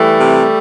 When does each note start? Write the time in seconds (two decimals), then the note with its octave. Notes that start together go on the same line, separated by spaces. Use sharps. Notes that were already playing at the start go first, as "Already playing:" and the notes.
Already playing: E3 G3 A3
0.20 C3